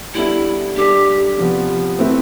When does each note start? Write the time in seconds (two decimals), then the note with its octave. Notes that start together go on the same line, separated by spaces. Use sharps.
0.14 G3 B3 D4 E4 A4 E5
0.76 G3 D4 G4 A4 D5
1.37 C3 F3 B3
1.99 A3 C4 E4 B4 E5